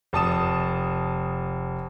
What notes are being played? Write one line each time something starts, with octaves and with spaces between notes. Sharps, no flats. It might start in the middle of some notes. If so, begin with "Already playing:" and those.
F1 A5 D#6 E7